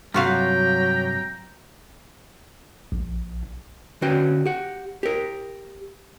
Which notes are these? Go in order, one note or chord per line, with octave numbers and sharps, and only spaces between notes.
G2 C3 F#3 F4 F#4 F5 G5 A#5
A#1
D3 C#4 F#4 B4 G5
G4 F#5
G4 A#4